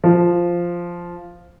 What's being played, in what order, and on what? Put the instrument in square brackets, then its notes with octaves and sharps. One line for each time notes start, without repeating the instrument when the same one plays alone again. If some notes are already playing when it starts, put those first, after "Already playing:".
[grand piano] F3